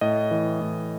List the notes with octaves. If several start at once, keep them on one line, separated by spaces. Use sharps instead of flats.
A2 D#5
E3
A2